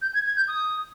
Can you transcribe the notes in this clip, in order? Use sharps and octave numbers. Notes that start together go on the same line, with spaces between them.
G6
G#6
G#6
G6
D#6